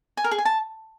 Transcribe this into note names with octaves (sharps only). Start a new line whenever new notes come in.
G#5
A#4
G#4
G#5
A5